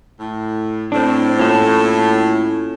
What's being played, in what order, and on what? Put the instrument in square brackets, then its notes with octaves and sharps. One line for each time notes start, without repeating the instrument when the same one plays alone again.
[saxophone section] A2
[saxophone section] A2 [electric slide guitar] C4 D4
[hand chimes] A#3 F4 [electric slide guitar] C#4 A4